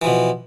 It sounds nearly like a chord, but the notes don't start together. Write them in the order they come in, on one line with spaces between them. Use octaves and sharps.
E3 F3 B2